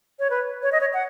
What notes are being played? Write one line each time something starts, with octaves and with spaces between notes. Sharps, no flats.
C#5
B4
C#5
D#5
C#5
F#5